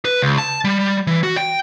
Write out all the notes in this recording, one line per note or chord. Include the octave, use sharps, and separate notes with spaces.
B4
C#2
A5
G3
E3
F#4
G5